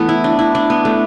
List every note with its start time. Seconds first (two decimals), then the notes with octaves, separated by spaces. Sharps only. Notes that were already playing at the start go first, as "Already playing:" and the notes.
Already playing: E3 A3 B3
0.09 E4
0.24 D4
0.39 E4
0.55 D4
0.70 B3
0.85 A3